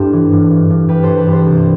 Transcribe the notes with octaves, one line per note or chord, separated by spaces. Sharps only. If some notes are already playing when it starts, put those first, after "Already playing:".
Already playing: G2 D4 E4 G4 A4 C5
E3
G2
G2
G2
G2 G4 B4
E3 A4 C5
G4 B4
G2
A4 C5
C2